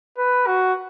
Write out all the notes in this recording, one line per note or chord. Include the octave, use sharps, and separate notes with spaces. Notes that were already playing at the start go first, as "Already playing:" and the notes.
B4
F#4